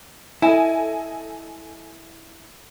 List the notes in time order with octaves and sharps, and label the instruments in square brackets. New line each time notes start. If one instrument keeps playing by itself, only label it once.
[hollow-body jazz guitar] E4 [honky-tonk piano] A4 D#5 G#5